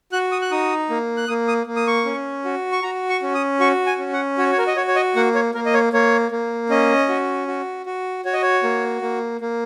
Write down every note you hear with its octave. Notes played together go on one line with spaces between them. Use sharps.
F#4 F#6
D#6
F#6
D#4 D#6
A#3
F#6
A#3 D#6
D#6
A#3
D#6
C#6
C#4
F#4
C#6
F#4 A#5
C#6
C#4
D#6
F#4 C#6
G#5
C#4
F#5
F#4 C#5
C#5
A#4
D#5
F#4 C#5
C#5
D#5
A#3 F#5
C#5
A#3 A#4
D#5
C#5
A#3 C#5
A#3
C#4 D#5
F#4
F#4
F#4
F#4 C#5
D#5
C#5
A#3
A#3
A#3